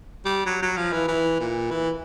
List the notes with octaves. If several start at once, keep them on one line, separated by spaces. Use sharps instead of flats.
G3
F#3
F#3
F3
E3
E3
A#2
E3